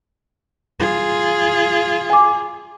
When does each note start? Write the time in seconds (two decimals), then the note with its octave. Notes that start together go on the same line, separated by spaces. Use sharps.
0.80 F4 G#4
2.10 G#5 D6